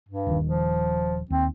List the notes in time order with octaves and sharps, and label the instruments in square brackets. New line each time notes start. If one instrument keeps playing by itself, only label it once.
[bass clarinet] G2
[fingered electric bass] D#1 D#3
[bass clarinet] F3
[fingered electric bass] D#2 [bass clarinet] C4